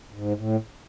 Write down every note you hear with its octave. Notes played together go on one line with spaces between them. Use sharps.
G#2
A2